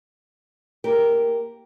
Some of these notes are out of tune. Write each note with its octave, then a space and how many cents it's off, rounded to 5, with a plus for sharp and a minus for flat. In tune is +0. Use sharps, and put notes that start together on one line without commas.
A#3 +0 G4 +0 A#4 +0